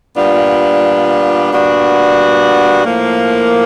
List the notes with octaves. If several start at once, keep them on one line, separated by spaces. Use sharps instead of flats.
A#2 G3 B3 D4 F4
A#2 G3 B3 D4 F#4
A2 F3 A#3